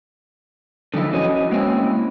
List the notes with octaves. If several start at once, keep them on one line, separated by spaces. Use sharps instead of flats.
D3 F3 F#3 D#4 E4
C#4 F#4 B4 D#5
G#3 A#3 C4 C#4 E4